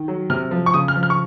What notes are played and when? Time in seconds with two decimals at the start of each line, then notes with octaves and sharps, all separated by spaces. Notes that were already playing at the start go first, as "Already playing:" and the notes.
Already playing: D#3
0.08 F#3
0.30 C3 F6
0.51 F3
0.66 C#6
0.74 C#3 D#6
0.88 F6
0.96 F3
1.03 F6
1.10 C#6